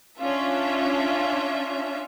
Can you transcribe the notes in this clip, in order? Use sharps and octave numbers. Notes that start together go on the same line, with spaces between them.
C#4 D4 F4 E5